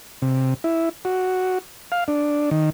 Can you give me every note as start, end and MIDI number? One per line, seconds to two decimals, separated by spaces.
0.22 0.54 48
0.64 0.89 64
1.05 1.58 66
1.92 2.04 77
2.08 2.50 62
2.51 2.70 51